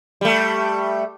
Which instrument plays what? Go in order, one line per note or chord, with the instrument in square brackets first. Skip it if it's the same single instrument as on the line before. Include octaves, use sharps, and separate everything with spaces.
[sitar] G3 A3